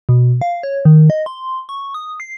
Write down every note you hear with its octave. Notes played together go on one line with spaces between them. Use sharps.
B2
F5
C#5
D#3
D#5
C6
C#6
D#6
C7